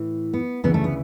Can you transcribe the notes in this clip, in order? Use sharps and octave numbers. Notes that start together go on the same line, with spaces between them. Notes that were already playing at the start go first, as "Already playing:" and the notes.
Already playing: A2 E3
B3
D2 C#3 E3 B3
A3
B3